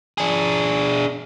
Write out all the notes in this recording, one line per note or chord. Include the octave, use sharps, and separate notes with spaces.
D4 G#4